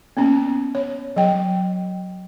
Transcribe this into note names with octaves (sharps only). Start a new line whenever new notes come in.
A#3 B3 C#4
C#5
F#3 G5